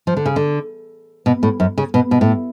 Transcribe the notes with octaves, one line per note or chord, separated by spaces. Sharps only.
F3
D3
C#3
D3
B2
A2
F#2
C#3
B2
B2
A2